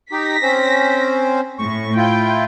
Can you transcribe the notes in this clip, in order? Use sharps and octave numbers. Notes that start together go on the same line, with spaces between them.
D#4 G4 A#6 B6
C4 C#4 C5
A2 C#6
E4 F4 G5